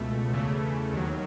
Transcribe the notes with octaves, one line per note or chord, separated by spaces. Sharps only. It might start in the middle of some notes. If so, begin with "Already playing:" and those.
Already playing: C#2 B2 A3
E2 C#3 E3 A3
D#2 D#3 F#3